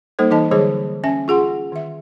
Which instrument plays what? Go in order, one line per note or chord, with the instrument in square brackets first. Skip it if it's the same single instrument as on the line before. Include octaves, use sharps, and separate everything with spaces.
[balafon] G3 A#3 D#4 A4 C5
E3 D#4 A4 D#5 A5
D3 F#3 G3 G#4 C5 C#5
C#4 E5 G#5
F4 G#4 F#5 C6
D#3 E5